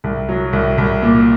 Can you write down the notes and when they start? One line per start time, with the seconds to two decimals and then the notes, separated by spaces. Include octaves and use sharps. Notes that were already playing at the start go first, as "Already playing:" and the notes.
0.04 C2
0.29 F#3
0.53 C2
0.78 C2
1.02 A#2